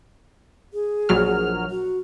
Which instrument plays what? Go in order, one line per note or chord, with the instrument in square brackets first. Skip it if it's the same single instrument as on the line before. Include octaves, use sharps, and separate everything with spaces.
[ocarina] G#4
[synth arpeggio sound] A#1 F#3 F6
[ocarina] F#4